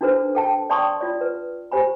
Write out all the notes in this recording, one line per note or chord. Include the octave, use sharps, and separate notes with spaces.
D4 D#4 F#4 A4 B4 C5
A4 G5 A5
D5 G5 A5 C6 C#6 D#6
F4 D5
B4
G4 C5 G#5 B5